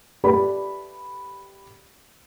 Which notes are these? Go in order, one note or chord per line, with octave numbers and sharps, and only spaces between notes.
A3 G4 B4 D5 B5